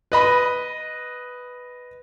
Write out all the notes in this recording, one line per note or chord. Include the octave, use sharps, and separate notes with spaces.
B4 D#5 B5